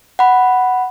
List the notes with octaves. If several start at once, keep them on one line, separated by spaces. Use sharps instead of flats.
F#5 B5